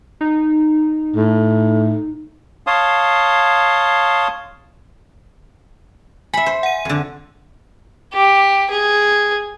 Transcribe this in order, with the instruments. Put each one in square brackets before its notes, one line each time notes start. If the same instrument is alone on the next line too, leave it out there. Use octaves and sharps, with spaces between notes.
[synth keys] D#4
[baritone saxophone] A2
[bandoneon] C#5 F5 A5 C6 D#6
[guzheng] E5 B5 [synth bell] G#5
[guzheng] C5
[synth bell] F#5 D#7
[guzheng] F2 D3
[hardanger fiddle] G4
G#4